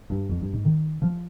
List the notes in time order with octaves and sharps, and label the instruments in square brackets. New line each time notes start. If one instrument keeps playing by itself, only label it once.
[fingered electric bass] G2
F2
G2
G#2
D#3
F3